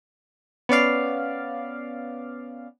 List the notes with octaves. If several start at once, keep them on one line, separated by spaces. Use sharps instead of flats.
B3 C#4 D5 F5